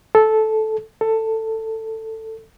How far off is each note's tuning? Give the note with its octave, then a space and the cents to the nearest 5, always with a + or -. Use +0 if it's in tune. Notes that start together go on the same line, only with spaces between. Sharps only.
A4 -10
A4 +15